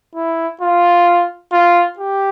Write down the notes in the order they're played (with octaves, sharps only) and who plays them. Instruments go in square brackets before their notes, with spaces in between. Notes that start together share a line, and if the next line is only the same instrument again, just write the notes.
[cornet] E4
F4
F4
G4